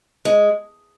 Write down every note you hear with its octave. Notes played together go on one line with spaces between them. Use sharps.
G#3